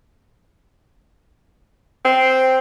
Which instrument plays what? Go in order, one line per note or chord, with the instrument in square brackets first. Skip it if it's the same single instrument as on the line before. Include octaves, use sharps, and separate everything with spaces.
[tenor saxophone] C4